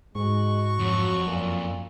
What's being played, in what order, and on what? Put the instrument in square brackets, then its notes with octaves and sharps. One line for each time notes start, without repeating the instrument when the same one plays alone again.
[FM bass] G#2 [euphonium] G#3 [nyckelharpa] F#4 C#6
[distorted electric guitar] F2 [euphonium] F#3
[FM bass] F#2 [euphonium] A#2